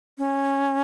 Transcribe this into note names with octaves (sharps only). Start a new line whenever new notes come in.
C#4